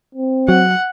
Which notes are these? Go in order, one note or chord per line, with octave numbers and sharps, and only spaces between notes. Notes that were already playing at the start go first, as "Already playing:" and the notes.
C4
F#3 F#5